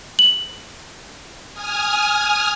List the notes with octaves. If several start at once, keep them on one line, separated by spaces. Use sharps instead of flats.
F#7
G#5 D#6 F6